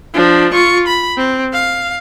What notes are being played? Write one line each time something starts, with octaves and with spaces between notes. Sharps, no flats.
F3 D4
F4 C#6
B5
C4
F5